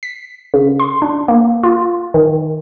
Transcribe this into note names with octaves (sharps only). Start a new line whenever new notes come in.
B6
C#3
C6
D4
A#3
F4
D#3